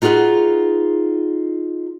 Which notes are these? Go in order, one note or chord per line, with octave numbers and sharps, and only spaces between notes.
D#4 F4 F#4 G#4 B4 F#5